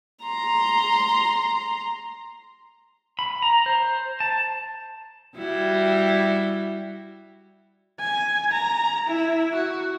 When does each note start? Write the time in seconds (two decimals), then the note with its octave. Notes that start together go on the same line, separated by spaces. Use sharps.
0.24 A#5 C6
3.19 B5
3.42 A#5
3.66 C5
4.20 A5
5.37 G3 E4 F#4
8.00 G#5
8.52 A#5
9.07 E4
9.55 F#4